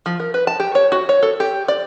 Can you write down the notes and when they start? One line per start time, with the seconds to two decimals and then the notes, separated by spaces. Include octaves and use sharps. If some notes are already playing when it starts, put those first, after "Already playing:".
0.06 F3
0.20 A#4
0.34 B4
0.47 A5
0.60 G4
0.75 C#5
0.92 F#4
1.09 C#5
1.23 A4
1.40 G4
1.68 D5